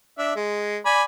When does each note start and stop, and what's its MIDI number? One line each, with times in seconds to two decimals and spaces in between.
0.18 0.33 62
0.18 0.33 76
0.36 0.78 56
0.86 1.03 74
0.86 1.03 80
0.86 1.03 83